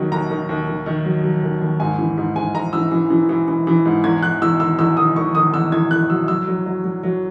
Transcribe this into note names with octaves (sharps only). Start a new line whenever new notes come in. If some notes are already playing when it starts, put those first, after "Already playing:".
Already playing: D#2 D#3 F#3
D#2 A#5
D#3
D#2
D#3
D#3
F#3
F#3
D#2
D#2
G#2 G#5
E3
G#2
G#2 G#5
G#2 A#5
E3 E6
E3
E3
E3
E3
E3
G#2
E2 G#6
E2 F#6
E2 E6
D#3 E6
E2 E6
D#3 D#6
D#3 C#6
D#3 D#6
E2 E6
E2 G#6
E2 F#6
F#3 E6
F#3 E6
F#3
F#3
F#3
F#3